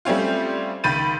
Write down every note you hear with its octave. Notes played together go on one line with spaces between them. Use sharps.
G3 A3 C4 C#4 F4
C#2 D#3 B5 G6 A6 D#7